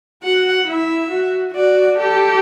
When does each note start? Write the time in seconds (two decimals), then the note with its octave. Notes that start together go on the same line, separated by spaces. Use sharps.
0.23 F#4 F#5
0.67 E4 E5
1.10 F#4
1.54 F#4 D5
1.98 G4 A4